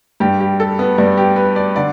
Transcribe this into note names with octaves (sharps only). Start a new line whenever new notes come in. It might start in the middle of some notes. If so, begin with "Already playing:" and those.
G2 G3 G4
G4
A4
B3
G2 G3 D4
G4
B4
D5
D3 D5